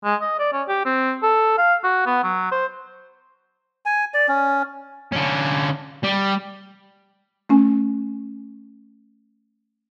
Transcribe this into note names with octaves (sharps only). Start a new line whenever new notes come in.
G#3
D#5
D5
C#4
G4
C4
A4
F5
F#4
B3
F#3
C5
G#5
D5
C#4
D3 C#4
G3
A3 C#4 G#5